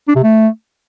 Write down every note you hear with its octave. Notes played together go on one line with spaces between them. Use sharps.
D4
C3
A3